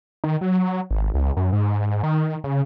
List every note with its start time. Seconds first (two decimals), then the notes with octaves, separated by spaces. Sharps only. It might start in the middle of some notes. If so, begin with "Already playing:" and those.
0.24 D#3
0.41 F#3
0.91 G#1
1.14 C#2
1.37 F#2
1.52 G#2
2.03 D#3
2.44 C#3